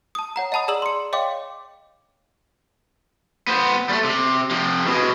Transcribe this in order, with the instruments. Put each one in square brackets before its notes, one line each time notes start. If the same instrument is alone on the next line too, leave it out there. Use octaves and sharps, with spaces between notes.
[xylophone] A5 D#6
C#5 F#5 A#5
D#5 F#5 A5 B5 D#6
G#4 D5 A#5 D#6 E6 F#7
C6 C#7
C#5 D#5 F5 G5 C6 D6
[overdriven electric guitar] B3 C5
G3 A3
C3
C3 F3
B2 G#3